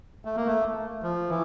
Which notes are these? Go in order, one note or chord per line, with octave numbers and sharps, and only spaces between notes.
A3
A#3
A3
F3
E3